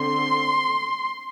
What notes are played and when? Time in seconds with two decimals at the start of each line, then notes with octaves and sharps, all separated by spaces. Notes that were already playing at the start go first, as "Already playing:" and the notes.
Already playing: D3 C4 C6